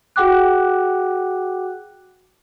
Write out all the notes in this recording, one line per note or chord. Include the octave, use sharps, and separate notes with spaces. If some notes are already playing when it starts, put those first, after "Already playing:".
F#4 G#4 F#5 G5 D6 F#6